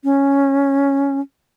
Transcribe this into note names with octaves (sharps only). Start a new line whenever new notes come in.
C#4